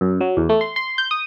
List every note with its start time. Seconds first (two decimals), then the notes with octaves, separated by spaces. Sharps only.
0.01 F#2
0.21 F#3
0.37 E2
0.49 A3
0.61 C6
0.76 C6
0.98 G6
1.11 D#6